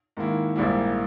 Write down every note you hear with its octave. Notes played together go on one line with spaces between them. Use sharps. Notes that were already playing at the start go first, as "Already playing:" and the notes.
G#2 D#3 A#3 E4
A#1 G#2 G3 A#3 E4